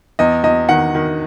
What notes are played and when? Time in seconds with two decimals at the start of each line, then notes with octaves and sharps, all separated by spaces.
0.19 E2 D#5
0.43 E2 D#5
0.69 D#3 F#5
0.95 D#3